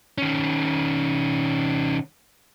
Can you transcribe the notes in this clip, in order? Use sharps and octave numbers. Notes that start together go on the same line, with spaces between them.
D#3 C#4